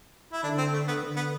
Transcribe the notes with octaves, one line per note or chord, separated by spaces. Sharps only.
E4
D3 D4
C4
A3
B3
D3
B3